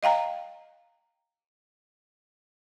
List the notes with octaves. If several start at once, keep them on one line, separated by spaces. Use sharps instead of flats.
D#5 F5 G5 A#5